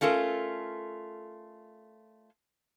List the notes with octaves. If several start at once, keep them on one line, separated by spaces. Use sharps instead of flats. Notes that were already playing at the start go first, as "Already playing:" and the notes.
A3 C#4 F4 A4 A#4